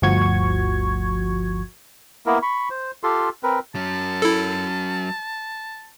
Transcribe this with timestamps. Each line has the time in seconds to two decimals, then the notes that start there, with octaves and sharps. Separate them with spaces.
0.02 G1 D2 F3 F#4 C#6 G#6
2.26 A#3 B3 E4 A#4
2.42 B5 C#6
2.71 C5
3.04 F4 G4 A4 C6
3.43 C4 A#4 B4
3.75 F#3 C#4 A5
4.22 E4 A4